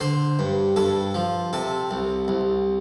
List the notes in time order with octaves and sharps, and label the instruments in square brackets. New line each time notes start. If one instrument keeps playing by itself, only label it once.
[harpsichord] D3 C5
G2
G2 A4
F3
C3 A4
C2
C2